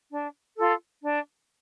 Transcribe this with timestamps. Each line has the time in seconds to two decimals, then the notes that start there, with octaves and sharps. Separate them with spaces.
0.11 D4
0.57 F4 A4
1.02 D4